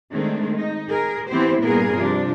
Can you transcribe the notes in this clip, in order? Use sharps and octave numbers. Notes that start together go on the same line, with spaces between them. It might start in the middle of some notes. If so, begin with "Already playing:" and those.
D#3 G#3 A3 C4 D4
D#4
G#4 A#4
E3 B3 C4 E4 G4 C5
G2 A#2 B3 G#4 A#4
C3 F3 D4